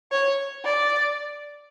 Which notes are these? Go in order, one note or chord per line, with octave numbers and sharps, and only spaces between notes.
C#5
D5